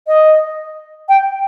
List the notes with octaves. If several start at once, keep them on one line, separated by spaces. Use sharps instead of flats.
D#5
G5